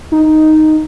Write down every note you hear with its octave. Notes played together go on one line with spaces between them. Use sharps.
D#4